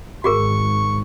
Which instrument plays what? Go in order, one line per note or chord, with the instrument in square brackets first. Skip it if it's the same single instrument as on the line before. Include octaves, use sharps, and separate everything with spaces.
[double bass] G#1 G#2 [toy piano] F#4 G#4 A#4 [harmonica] C#6